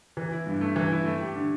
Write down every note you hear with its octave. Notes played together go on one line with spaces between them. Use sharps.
E3
E4
G2
A3
E3
E4
A3
G4
D3